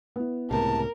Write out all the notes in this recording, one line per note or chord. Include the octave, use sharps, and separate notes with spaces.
B3 E4
C#2 A2 C3 A#4 A5